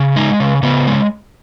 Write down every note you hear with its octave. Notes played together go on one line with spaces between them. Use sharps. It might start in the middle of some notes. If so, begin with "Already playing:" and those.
Already playing: C#3
G#3 D#4
C#3
C#3 B3
G#3